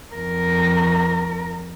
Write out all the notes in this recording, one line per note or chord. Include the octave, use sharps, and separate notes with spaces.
F2 A#4